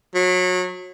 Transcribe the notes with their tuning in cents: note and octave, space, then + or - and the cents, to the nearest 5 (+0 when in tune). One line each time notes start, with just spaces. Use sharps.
F#3 -25